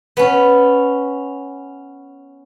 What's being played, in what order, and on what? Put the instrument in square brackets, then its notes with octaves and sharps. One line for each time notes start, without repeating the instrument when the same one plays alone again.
[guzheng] B3 C#4